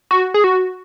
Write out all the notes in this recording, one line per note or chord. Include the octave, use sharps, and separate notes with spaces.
F#4
G#4
F#4